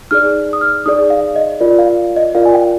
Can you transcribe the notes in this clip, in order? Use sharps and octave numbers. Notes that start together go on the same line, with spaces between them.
D#4 G#4 D5 F6
D#6
F6
D#4 G#4 D5 D#6
F5
D#5
F4 A#4 D5
F5
D#5
F4 A#4 D5 F5
G#5
G5